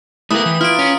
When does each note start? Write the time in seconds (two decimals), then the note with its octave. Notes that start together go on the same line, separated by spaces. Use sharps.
0.31 A3 E4 G4 A#4 B4 D#6
0.46 E3
0.61 E4 F4 A#4 F6 D7
0.79 C#4